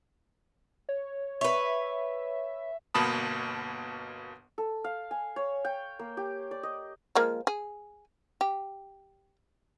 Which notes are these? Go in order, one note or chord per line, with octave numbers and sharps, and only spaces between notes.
C#5
B4 C#5 E5
G1 B2 A#3 A5 B5 D#6
A4
F5
G#5
C#5
G5
A#3
G4
D5
D#5
F3 G#3 A#3
G#4
G4